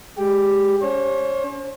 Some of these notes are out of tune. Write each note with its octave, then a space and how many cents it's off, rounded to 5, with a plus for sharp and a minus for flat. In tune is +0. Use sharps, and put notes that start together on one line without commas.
G#3 +0 G4 +0
C#4 +35 C5 +45